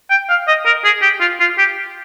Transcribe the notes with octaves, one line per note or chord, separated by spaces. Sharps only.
G5
F5
D#5
A#4
G#4
G4
F4
F4
G4